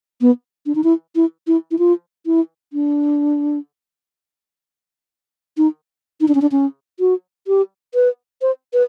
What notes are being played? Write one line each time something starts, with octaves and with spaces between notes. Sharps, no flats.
B3
D4
D#4
E4
E4
E4
E4
F4
E4
D4
D#4
D#4
D4
C#4
D4
C#4
F#4
G4
B4
C5
B4